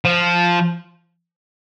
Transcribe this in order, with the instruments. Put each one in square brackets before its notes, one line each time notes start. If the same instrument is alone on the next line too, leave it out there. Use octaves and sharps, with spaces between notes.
[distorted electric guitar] F3